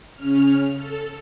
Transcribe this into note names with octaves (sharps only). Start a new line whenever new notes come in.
C#3 C#4 F6
A4